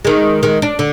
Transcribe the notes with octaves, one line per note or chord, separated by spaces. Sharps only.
D#3 G#3
D#3 G#3
D4
D3